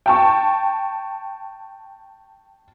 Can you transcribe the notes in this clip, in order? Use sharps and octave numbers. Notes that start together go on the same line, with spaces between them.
G5 A5 C#6